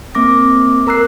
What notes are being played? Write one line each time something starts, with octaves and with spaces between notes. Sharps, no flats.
A#3 C4 D6 A#6
A#4 A#5 E6 F#6 C7